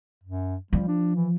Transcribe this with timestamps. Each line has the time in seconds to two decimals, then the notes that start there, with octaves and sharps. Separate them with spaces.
0.23 F#2
0.73 F3 G3
0.88 D4
1.15 E3